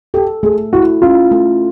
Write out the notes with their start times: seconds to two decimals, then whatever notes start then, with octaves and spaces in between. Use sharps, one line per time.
0.14 G4 A4
0.43 A3 G#4
0.73 E4 F#4
1.02 C#4 F4
1.32 A3